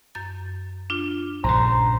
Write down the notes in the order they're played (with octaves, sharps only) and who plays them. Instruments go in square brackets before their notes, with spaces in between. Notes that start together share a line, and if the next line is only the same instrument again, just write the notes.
[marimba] F#2 G6 A6
D4 F4
[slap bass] A#1 G2 C#3 [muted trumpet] C5 [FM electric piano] A#5